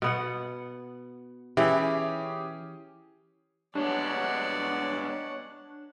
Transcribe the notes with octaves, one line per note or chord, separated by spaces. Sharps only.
B2 B3 F#5
E3 C#4 E4 G4 G#4
G3 G#3 B3 D4 C#5 D5 F#5